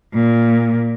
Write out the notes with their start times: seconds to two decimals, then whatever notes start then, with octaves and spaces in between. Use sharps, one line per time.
0.14 A#2